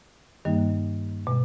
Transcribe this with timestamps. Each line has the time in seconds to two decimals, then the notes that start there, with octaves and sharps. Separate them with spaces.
0.45 G2 D#3 G3 A#3 D#4
1.27 B2 G#3